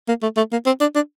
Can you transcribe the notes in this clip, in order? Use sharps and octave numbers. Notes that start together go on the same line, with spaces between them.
A#3
A3
A3
A#3
C4
D4
D4